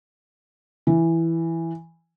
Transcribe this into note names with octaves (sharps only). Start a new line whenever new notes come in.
E3